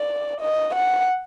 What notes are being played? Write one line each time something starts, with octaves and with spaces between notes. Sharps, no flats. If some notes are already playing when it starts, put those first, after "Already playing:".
Already playing: D5
D#5
F#5